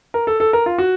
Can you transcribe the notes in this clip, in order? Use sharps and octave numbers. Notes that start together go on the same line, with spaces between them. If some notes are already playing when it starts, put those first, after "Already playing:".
A#4
A4
A4
A#4
F4
F#4